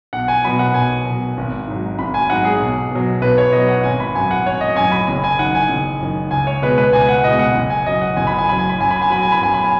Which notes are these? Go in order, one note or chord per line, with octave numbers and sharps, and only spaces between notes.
B1 F#5
G#5
B2 F#3 B5
F#5
B1 G#5
F#3
B2
G#1
G#2 F#3
G#1 B5
G#5
G#2 F#3 F#5
G#4
B1
B2 F#3
B1 B4
C#5
B2 F#3 D#5
F#5
G#1 G#5
B5
F#2 F#3 G#5
F#5
G#1 C#5
D#5
F#2 F#3 G#5
B5
F#1 B5
G#5
F#2 D#3 F#5
G#5
F#1
F#2 D#3
C#2 G#5
C#5
B2 G#3 B4
B4
C#2 G#5
F#5
B2 G#3 D#5
F#5
F#1
G#5
F#2 F#3 D#5
F#5
F#1 G#5
B5
G#5
F#2 F#3 B5
G#5
B5
F#2 G#5
B5
G#5
F#3 B5
G#5
B5
F#2 G#5
B5
G#5